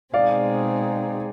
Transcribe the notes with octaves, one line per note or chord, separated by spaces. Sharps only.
B2 G#3 C4 D#4 G#4 D5 F5